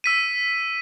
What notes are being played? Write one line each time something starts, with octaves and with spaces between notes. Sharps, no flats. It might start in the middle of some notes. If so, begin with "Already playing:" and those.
E6 B6 D#7